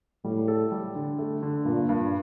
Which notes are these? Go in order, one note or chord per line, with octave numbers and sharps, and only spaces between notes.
A2 G3
A4
G3
D3
A3
D3
G2 A#2
G2